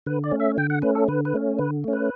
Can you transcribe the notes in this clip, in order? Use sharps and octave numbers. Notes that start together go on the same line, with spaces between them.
D3 B4
D5
A3 C#4
E5
D3 G5
F#5
A3 C#4 B4
A4
D3 B4
B4
A3 C#4
D3 B4
A3 C#4
B4